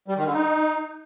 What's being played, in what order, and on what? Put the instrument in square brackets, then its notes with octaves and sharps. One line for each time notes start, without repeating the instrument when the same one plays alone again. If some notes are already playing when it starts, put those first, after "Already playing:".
[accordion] G3
D#3
D3
D#4